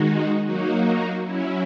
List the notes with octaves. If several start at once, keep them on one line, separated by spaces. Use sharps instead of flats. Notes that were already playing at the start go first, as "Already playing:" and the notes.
Already playing: D#3 G#3 D#4 F#4
F#3 A#3 D#4 F#4
F#3 C#4 E4